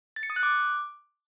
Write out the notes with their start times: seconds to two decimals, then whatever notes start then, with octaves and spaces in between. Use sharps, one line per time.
0.16 A6
0.23 C#7
0.30 D#6
0.36 F#6
0.43 D6